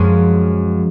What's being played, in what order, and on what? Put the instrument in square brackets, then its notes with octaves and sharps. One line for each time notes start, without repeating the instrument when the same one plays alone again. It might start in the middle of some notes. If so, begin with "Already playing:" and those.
Already playing: [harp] F#2 F3 G#3 C#4 G#4